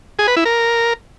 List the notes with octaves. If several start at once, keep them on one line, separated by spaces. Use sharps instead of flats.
G#4
B4
E4
A#4